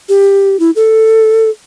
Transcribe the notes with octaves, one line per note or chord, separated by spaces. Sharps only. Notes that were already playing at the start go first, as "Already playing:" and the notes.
G4
E4
A4